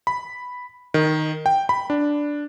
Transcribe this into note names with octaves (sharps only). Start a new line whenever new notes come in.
B5
D#3
G5
B5
D4